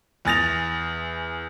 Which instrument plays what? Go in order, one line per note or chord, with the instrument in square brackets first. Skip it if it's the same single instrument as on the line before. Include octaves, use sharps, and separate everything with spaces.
[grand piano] E2 G#5 D#6 A6 A#6 F7